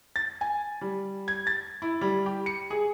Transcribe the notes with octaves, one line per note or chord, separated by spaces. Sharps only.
A6
G#5
G3
G#6
A6
E4
G3
G4
C#7
G#4